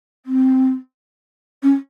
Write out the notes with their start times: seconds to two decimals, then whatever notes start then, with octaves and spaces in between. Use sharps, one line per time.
0.25 C4
1.62 C#4